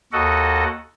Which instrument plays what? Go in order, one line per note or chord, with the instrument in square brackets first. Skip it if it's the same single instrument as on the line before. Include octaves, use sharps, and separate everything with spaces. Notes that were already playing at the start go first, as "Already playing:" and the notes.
[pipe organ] D#2 F#4 A4 D#5 F#5